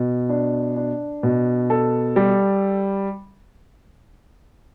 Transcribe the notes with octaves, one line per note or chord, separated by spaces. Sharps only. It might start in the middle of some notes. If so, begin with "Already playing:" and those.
Already playing: B2
D4
D4
B2
A4
G3